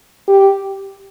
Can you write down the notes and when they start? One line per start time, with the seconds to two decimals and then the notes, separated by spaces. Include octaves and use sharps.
0.28 G4